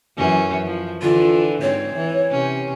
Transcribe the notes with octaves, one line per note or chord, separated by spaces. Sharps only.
F#2 E3 C#4
F3
D3 E3 F4
G#2 C4 C#5
E3
C3 C#4